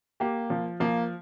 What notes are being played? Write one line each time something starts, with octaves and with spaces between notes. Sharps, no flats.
A#3 G4
F3
F3 A#3